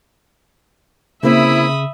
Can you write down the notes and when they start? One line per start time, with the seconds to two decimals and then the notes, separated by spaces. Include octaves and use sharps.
1.23 C#3 A#3 C4 C#4 E4 E5 B5 D#6